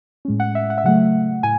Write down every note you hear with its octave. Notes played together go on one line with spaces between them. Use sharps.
A2 G#3 C#4
F#5
E5
F#5
E5
C#3 F#3 A3 F#5
A2 G#5